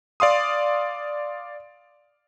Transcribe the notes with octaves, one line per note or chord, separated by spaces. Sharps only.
D5 F5 C6 D#6